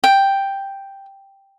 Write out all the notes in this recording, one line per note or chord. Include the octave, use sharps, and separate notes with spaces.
G5